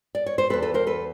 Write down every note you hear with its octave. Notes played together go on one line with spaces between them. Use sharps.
D5
C#5
C5
E2 B2 A4 B4
A4 B4
A#4 C5
A4 B4